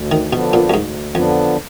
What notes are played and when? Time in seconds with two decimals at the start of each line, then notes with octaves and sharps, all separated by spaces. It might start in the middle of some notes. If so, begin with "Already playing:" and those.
Already playing: D2
0.11 D#3
0.33 B2 D3 F3 B3 D4
0.53 A#2
0.70 F#2
0.73 D2 G#2
1.15 F2 D3 F3 B3 D4